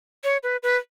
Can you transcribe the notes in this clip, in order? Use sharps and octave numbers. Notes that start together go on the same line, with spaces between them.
C#5
B4
B4